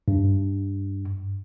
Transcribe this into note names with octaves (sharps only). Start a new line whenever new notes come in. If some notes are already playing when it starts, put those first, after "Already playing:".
G2